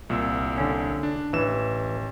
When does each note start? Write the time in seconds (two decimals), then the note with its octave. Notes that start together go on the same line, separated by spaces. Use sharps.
0.10 C2 A#2 E6
0.57 D3 C#4
1.03 D4
1.33 A1 E3 E7